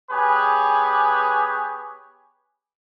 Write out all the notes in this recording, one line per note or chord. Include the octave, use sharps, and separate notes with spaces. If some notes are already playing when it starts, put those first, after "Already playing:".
B3 G4 G#4 B4 C#5 G#5